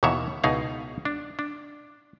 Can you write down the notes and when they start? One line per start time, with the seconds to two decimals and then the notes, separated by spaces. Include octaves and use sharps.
0.03 D#2 B2 D#3 E3 C#5 E5
0.44 C#2 B2 D#4 E4 G#4 F5
1.05 D4
1.39 D4